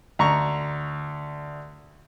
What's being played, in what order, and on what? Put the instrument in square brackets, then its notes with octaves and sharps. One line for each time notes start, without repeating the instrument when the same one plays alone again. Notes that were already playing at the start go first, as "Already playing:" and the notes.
[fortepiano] D2 A#5 C#6